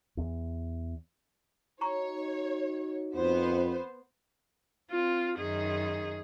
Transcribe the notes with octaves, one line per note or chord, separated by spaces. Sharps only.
E2
D#4 F#4 C#5 A#5 C#6
F2 B3 C5
C4 F4
F#2 D#3 G#4